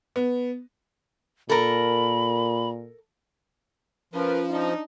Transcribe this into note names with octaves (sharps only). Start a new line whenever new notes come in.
B3
A#2 A4 A#4 B5
F3 C#4 F4 A#4 B4
D4 D#4